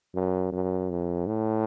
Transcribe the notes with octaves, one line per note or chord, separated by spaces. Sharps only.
F#2
F#2
F2
A2